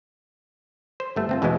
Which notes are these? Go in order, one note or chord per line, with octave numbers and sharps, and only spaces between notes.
C5
G1 A3
A3 C4 F4
E2 B2 E3 G#3 E4 D#5